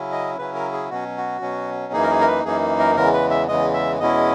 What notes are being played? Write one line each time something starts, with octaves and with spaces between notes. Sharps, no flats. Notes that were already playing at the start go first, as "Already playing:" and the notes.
Already playing: C#3 F#3 C#4 E4
D#5
C#3 F#3 C#4 E4 B4
A#4
G#4
B2 F#3 C#4 F#4
F#4
B2 F#3 C#4
F#2 E3 A#3 D#4 G#4
A#4
G#4
A#4
B4
F#2 E3 A#3 D#4 G#4
A#4
E2 C#3 E3 G#3 A#4
B4
E5
E2 C#3 E3 G#3 D#5
E5
E2 B2 G#3 C#4 E4 D#5